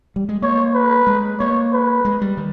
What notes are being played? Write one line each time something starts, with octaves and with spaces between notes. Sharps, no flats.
G3
G#3
A#3 C#5
B4
G#3
A#3 C#5
B4
G#3
G3
D#3